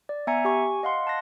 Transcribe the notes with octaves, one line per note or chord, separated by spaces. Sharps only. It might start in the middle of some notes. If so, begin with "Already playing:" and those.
D5
B3 E5 G#5 A#5 G#6 C#7
G4 G#5 C#6
D#5 F5 F#5 C6
A5 F#6 A#6